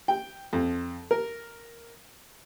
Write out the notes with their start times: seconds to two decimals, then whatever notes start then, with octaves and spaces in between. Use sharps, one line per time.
0.08 G5
0.53 F2
1.11 A#4